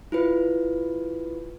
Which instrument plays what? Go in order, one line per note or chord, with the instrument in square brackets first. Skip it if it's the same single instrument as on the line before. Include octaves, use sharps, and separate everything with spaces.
[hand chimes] E4 F4 B4